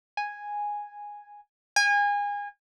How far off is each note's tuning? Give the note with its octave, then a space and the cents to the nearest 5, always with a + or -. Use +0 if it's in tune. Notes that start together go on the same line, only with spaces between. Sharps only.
G#5 -5
G#5 -30